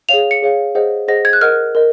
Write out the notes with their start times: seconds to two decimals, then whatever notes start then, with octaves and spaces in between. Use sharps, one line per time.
0.09 G#4 C#5 F5 F7
0.31 C#7
0.42 G#4 C#5 F5
0.75 G#4 C5 D#5 F#5
1.08 G#4 C5 D#5 F#5 A#6
1.25 G#6
1.33 F#6
1.41 A#4 D#5 F#5 F6
1.75 A#4 D#5